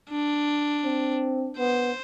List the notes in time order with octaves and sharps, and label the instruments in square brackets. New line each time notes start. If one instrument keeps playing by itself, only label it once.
[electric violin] D4
[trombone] C4
[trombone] B3 [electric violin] C5